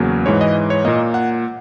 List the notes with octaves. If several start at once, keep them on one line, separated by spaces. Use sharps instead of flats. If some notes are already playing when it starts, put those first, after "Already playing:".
Already playing: E2 C#3 F#3 A#3
G#2 E3 G#3 C#5
D#5
C#5
A#2 A#3 D#5
F#5